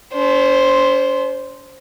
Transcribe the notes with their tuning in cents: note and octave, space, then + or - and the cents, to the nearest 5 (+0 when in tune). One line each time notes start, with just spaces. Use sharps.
C#4 +45 C5 +0